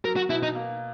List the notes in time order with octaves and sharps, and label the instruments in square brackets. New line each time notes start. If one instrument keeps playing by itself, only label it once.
[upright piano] F#3 [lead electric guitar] A#4
[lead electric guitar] F#4
[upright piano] B2 [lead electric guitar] E4
[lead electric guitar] D#4
[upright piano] A#3